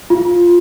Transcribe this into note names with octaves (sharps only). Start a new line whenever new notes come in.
F4